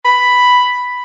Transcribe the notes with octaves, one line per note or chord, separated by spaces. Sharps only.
B5